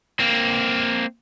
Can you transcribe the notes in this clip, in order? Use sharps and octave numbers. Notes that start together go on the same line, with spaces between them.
A#3 C4